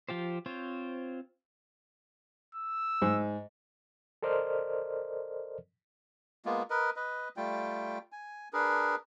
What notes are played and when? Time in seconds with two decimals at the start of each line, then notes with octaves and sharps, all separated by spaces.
0.09 F3 F4 G4 C5
0.46 C4 F4 C5 C#5
2.55 E6
3.02 G#2
4.23 A4 A#4 C5 D5 D#5 F6
6.45 G#3 A#3 B3 F4
6.70 A#4 B4 D#5
6.96 B4 D#5
7.37 G3 A3 F4 G5
8.12 G#5
8.53 D4 G#4 A#4 B4